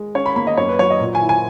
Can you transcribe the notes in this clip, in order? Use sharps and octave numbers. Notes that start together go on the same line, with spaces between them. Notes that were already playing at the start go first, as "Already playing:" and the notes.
Already playing: G#3
C#4 C#5
B5
A#3 B5
D#5
F#2 C#5
B4
F#3 C#5
D#5
A#2
G#5
E4
G#5